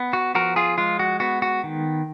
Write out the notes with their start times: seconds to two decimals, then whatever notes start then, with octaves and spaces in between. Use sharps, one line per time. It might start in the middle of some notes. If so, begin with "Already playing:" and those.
Already playing: B3
0.13 F#4
0.35 F3 F#4 A#4
0.56 F4 G#4
0.78 G#3 F4
0.99 F#4
1.20 B3 F#4
1.42 F#4
1.64 D#3